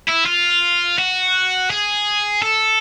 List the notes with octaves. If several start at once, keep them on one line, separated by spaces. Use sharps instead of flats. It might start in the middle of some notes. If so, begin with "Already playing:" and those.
E4
F4
F#4
G#4
A4